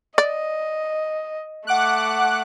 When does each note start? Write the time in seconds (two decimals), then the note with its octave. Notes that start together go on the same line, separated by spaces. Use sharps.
0.18 D5 D#5
1.67 A3 F#5 D6 F#6